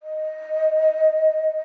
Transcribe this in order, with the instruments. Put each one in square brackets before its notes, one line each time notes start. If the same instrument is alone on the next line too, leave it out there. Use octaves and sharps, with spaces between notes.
[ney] D#5